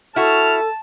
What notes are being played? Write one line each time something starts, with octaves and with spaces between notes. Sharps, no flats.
E4 F#4 A4 A5 F6